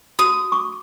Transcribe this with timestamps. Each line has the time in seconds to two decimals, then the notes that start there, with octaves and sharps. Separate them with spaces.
0.19 F#4 D#6
0.52 C#6 D6